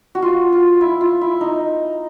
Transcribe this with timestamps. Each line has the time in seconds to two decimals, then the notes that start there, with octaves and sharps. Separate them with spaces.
0.15 F#4
0.22 F4
0.52 F4
0.81 E4
1.01 F4
1.21 E4
1.41 D#4